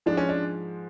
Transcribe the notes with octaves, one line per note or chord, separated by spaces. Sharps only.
G#2 F3 G#3 D4
C#4
D4